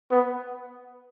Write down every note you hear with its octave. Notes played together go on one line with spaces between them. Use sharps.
B3